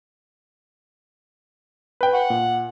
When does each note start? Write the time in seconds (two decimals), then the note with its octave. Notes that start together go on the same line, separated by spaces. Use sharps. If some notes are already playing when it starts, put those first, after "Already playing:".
2.01 B4 G5
2.13 F#5
2.30 A#2